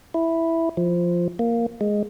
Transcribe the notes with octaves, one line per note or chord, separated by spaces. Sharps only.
E4
F3
A#3
G#3